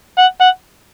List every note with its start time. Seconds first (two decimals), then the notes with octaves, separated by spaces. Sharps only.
0.18 F#5
0.41 F#5